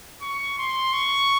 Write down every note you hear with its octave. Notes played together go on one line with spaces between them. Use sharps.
C#6
C6
C#6